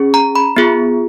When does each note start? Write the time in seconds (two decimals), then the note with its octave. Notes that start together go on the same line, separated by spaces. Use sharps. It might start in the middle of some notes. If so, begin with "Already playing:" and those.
Already playing: C#4 G#4
0.14 A#5
0.35 B5
0.57 B3 F4 G#4